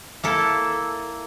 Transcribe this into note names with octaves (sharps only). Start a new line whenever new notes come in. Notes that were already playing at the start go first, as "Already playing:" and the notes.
A#3 E4 A4